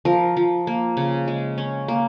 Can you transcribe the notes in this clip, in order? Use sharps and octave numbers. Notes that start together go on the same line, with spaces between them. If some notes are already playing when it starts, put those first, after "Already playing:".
F3 A#4
F3
A#3
C#3
G#3
C#4
A#3